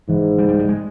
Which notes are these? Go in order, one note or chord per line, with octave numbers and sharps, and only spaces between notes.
G#2 E3
G3
G3
G3
G#3